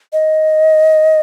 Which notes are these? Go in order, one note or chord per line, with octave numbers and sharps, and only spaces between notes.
D#5